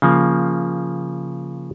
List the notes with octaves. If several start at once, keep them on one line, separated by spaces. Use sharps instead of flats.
C#3 F3 A#3